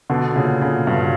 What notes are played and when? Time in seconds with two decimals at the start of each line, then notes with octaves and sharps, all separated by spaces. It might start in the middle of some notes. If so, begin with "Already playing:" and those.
0.10 B2 D3
0.36 A#2 C#3
0.61 A#2 C#3
0.87 G2 B2